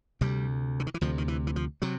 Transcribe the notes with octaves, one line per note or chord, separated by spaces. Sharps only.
D2 C3 G3
D3
D#3
E3
D2 C3 F3
D#3
E3
E3
F3
C3 F#3